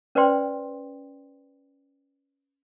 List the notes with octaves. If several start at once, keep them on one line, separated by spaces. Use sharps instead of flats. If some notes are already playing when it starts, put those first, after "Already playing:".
C#4 B4 C5 D5 G5 C6